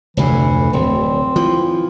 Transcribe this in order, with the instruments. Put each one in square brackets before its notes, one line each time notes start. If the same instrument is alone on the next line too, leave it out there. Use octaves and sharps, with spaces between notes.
[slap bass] F1 D2 A2 [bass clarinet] E3
[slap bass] D1 [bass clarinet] C4
[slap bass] E3 F3